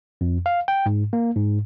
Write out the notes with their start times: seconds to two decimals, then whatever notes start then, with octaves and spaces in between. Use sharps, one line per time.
0.21 F2
0.46 F5
0.68 G5
0.86 G#2
1.13 A#3
1.36 G#2